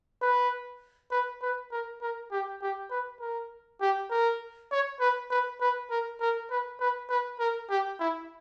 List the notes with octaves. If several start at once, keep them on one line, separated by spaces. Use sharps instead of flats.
B4
B4
B4
A#4
A#4
G4
G4
B4
A#4
G4
A#4
C#5
B4
B4
B4
A#4
A#4
B4
B4
B4
A#4
G4
E4